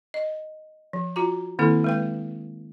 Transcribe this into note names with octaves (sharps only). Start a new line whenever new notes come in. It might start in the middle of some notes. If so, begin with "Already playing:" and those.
D#5
F3
F4 F#4 A#5
D#3 A#3 C4 E4 A4
G#3 B4 G5